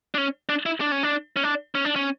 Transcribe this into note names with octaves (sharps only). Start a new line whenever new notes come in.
D4
C#4
D4
E4
D4
C#4
D4
C#4
D4
C#4
D4
C#4